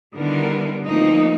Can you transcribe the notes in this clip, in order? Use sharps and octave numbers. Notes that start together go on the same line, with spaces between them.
D3 D#3 G3 B3 E4 A#4
D2 E3 F3 A#3 C4 D#4